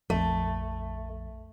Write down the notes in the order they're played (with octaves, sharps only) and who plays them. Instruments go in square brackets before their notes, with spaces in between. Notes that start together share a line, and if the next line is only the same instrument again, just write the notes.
[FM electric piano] A#1 F2 [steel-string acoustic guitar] A3